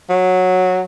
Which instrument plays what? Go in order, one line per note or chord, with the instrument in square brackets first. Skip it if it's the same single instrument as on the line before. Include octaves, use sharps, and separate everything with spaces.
[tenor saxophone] F#3